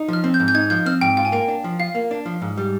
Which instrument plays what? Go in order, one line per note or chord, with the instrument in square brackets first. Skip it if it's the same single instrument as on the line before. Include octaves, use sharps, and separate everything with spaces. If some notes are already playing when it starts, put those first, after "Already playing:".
Already playing: [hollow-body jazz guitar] D#4
[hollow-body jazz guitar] F3 [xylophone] F6
[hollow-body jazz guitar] C4
[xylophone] G6
[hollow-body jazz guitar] G#2
[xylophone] G6
[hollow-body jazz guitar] D#4 [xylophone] G#6
[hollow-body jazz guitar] F3 [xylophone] G6
[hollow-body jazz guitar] C4 [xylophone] F6
[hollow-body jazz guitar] G#2 [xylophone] G5
[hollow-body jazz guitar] F4 [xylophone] G5
[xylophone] G#5
[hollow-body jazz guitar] A#3 [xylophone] G5
[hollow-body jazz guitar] D4
F3
[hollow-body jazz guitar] F4 [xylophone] F5
[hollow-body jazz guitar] A#3
D4
F3
G#2
G3